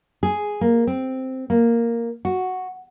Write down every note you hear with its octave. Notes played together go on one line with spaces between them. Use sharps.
G#4
A#3
C4
A#3
F#4